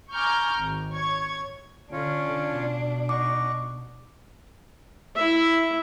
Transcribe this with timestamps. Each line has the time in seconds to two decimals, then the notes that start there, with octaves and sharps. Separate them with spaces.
0.14 G#5 A#5 C#6 D6 F6 G6
0.56 G#1
0.92 C#5 C#6 G#6
1.92 D3 C#4 D4 F4 C#5
2.51 B2
3.09 D#4 F#5 C#6 D6
5.16 E4 E5